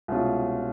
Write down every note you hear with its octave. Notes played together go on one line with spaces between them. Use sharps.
C2 B2 G#3 C#4 F4